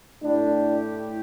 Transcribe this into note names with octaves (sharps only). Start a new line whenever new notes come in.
A2 A3 D4 E4 G4